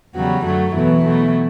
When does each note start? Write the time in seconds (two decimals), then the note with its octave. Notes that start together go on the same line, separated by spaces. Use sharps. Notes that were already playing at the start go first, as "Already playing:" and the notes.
0.15 E2 C#3 F#3 G3 F#4
0.44 F#2 D3 F#3 A3 F#4
0.73 E2 B2 E3 F#3 A3 E4
1.02 B2 F#3 A3